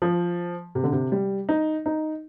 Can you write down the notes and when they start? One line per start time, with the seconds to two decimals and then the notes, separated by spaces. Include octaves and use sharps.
0.02 F3
0.75 C3
0.83 D3
0.92 C3
1.12 G3
1.49 D#4
1.86 D#4